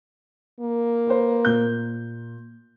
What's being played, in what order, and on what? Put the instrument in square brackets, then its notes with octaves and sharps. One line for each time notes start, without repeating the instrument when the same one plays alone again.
[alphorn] A#3
[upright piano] B4 C5
A#2 G6